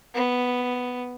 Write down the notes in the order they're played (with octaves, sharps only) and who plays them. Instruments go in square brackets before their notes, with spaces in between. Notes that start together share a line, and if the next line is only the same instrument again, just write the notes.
[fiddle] B3